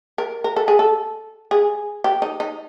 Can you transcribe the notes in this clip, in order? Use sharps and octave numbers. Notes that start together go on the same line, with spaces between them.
A#4
A#4
A4
G#4
A4
G#4
G4
D#4
D#4